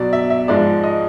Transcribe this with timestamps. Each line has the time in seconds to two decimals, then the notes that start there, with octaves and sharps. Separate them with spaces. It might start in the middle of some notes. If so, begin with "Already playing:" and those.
Already playing: B2 F#3 D5
0.13 E5
0.30 E5
0.48 G#2 F3 G#3 D5
0.83 D#5